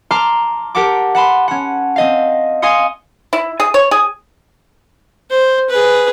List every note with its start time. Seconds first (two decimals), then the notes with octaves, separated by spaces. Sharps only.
0.11 A5 A#5 C6 D6 F6 C7
0.75 G4 A#4 F#5 A5 D6
1.15 F#5 A5 B5 C6
1.48 C#4 F#5
1.96 C4 D#5 F5
2.62 D#5 F5 G#5 C6 D#6 C#7
3.33 E4
3.60 G#4
3.74 C#5
3.91 G#4
5.30 C5
5.70 G#4 B4